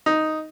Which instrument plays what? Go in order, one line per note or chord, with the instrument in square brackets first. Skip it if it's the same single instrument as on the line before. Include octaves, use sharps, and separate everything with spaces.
[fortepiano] D#4